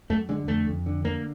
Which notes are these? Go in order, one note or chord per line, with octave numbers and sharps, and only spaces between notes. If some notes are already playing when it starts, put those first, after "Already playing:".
F#2 A3
D3 G#3
F2 A3
F2
D3
D3 A#3